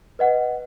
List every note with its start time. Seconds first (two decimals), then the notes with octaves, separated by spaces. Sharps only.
0.19 B4 D#5 F#5